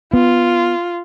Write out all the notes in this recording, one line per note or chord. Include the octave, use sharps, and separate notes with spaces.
B3 F4